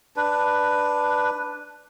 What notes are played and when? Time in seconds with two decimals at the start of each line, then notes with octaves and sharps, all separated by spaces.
0.16 D4 B4